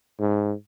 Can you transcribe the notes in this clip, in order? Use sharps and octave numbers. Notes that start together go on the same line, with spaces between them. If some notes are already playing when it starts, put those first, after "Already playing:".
G#2